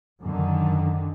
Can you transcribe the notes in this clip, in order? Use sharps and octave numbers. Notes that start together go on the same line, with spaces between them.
F#2 D3 D#3